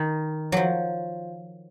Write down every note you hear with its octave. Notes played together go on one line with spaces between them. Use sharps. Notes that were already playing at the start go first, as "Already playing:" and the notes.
Already playing: D#3
F3 F#3